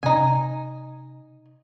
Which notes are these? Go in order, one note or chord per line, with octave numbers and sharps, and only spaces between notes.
C3 C#4 D#4 G#5